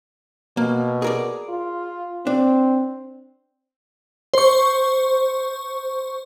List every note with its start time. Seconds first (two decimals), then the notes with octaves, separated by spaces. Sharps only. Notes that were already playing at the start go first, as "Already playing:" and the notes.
0.57 B2 A#3
1.02 G#4 A#4 D5
1.49 F4
2.27 C4 D4
4.34 C5 C#6